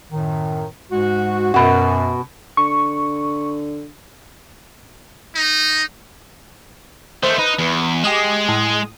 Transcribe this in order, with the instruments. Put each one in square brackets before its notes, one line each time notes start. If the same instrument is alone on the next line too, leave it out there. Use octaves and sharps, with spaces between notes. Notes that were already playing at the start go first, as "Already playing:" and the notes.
[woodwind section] F#2 A2 D#3
G#2 G#3 F#4
[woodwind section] F#2 [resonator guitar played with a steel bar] B2 F#4
[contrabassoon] D3 [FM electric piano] C#6
[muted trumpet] D#4
[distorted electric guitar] D#3 A3 [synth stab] C5
[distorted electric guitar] D#4 [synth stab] B4
[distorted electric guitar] E2
[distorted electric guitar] G#3 [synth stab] G4 D#6 E7
[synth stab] A2 D#6